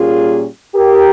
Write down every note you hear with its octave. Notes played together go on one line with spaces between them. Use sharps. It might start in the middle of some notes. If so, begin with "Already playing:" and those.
Already playing: A#2 G3 A#3 C#4 F4 G#4
G4 A#4